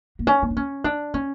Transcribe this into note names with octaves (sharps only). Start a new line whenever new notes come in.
A#3
C#4
A#3
D4
C#4
D4
C#4